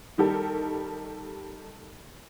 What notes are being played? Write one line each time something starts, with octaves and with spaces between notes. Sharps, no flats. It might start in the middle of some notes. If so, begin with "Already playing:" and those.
D#3 G3 D#4 G4 A4 A#4